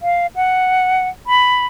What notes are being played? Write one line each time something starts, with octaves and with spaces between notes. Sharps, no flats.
F5
F#5
B5